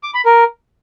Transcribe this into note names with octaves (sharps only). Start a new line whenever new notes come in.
D6
B5
A#4